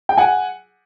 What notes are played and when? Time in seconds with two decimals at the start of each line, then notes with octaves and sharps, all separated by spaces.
0.09 G5
0.17 F#5 G#5